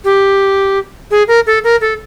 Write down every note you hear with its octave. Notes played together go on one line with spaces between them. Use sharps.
G4
G#4
A#4
A4
A#4
A4